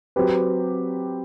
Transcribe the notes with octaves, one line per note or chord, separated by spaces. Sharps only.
F#3 C4 G4 B4